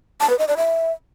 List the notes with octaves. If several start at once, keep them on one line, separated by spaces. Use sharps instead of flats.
A5
B4
D#5
D5
E5